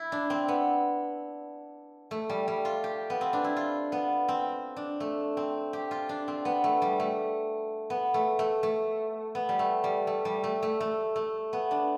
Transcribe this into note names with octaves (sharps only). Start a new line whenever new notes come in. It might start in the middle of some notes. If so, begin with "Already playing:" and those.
Already playing: E4
D4
C4
B3
A3
G3
G3
F4
G4
B3
C4
D4
E4
F4
B3
C4
D4
A3
C4
G4
F4
D4
C4
B3
A3
G3
A3
B3
A3
A3
A3
B3
G3
A3
G3
A3
G3
A3
A3
A3
A3
B3
D4